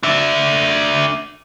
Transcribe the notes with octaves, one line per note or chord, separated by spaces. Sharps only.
D4 E5